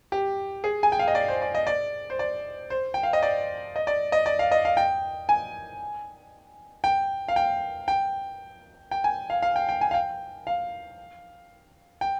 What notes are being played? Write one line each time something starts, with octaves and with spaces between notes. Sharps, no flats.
G4
G#4
G#5
G5
F5
D#5
D5
C5
D5
D#5
D5
C5
D5
C5
G5
F5
D#5
D5
D#5
D5
D#5
D5
F5
D#5
F5
G5
G#5
G5
F5
G5
G5
G5
G#5
F5
F5
G5
G5
G#5
F5
G5
F5
G5